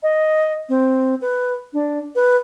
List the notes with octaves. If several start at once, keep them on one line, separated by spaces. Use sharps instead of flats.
D#5
C4
B4
D4
B4